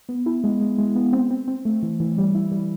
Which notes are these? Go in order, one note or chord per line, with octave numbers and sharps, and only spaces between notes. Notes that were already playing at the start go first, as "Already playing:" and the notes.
B3
E4
G#3
G#3
G#3
B3
C4
C4
C4
A3
E3
E3
G3
E4
G3